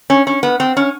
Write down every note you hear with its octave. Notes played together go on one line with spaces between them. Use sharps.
C#4
C#4
B3
C4
C#4